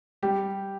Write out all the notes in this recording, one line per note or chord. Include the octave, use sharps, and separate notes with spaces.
G3 G4